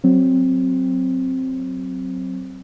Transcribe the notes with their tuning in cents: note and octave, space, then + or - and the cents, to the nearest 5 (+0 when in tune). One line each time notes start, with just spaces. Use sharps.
F#3 +5 C4 +0